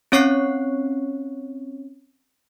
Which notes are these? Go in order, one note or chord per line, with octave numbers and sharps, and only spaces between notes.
C4 C#4 C#5 C#6 F#6 C7